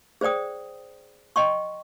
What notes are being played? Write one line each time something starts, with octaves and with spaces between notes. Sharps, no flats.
G#4 C5 D5 G5 D#6
D#5 G5 C6 C#6